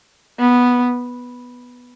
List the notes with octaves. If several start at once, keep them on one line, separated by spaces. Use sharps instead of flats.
B3